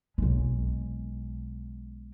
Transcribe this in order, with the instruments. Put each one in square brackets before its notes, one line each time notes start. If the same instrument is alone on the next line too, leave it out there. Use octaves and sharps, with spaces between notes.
[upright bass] B1 G#3